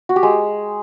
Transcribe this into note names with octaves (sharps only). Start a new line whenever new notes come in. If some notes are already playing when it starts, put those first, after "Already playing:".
F#4
G4
G#3